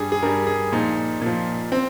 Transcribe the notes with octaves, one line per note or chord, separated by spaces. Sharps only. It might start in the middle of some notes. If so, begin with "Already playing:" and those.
Already playing: G2 G3 G#4
G#4
G2 G3 A#4
G#4
A#2 F3 D#4
A#2 F3
C4